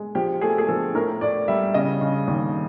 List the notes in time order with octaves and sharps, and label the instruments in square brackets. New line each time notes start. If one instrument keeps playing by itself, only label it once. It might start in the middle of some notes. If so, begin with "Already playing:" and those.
Already playing: [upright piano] G#3
F3 G4
A3 G#4
G#4
F3 A4
A2 A#4
A2 D5
G3 E5
C#3 D#5
C#3
D#2